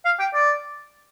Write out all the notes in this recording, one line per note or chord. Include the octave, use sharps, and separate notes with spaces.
F5
G5
D5